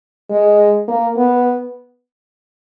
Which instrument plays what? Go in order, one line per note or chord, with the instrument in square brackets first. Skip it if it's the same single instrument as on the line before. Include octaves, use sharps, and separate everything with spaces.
[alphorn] G#3
A#3
B3